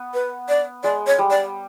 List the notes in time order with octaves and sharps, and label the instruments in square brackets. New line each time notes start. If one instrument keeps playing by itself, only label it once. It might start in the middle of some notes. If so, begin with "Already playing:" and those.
Already playing: [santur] B3
[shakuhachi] B4
D5
[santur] G#3 [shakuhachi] D5
[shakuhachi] C#5
[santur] G3
[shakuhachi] D5